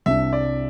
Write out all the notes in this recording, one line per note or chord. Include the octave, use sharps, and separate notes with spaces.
C2 C3 G3 D4 E5
D5